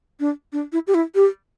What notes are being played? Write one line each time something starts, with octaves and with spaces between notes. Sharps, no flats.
D4
D4
E4
G4
E4
G4